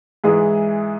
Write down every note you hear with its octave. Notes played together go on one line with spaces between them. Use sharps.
G#2 E3 G#3 E4 G#4